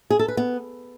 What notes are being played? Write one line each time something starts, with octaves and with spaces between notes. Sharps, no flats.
G#4
A4
B4
B3